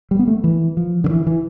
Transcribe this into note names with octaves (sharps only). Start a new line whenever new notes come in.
G3
B3
A3
E3
F3
D3
E3
E3